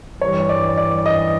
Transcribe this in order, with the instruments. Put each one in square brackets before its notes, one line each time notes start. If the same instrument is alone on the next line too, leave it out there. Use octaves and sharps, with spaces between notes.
[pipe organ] G2 E3 G3 [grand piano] C#5
[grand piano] D5
D5
D#5